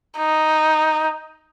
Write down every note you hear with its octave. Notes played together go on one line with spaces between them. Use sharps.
D#4